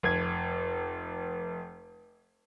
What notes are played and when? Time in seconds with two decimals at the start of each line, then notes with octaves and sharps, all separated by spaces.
0.03 F1 G#6